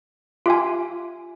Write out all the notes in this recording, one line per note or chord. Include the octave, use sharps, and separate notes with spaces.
F4 G4 E5 F5 G#5